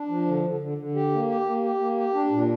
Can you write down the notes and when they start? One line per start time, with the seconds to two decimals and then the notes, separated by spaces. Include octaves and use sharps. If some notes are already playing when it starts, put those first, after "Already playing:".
Already playing: D4
0.09 F3
0.27 D3
0.44 D3
0.60 D3
0.78 D3
0.95 G4
1.12 A#3
1.28 G4
1.46 A#3
1.63 G4
1.80 A#3
1.97 G4
2.14 D4
2.31 A#2